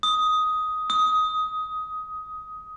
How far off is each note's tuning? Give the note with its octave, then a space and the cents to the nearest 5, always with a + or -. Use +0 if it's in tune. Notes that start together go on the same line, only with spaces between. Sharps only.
D#6 +10
D#6 +15